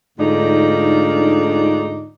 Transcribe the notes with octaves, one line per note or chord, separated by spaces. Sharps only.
D2 G#2 D3 D#4 F4 D5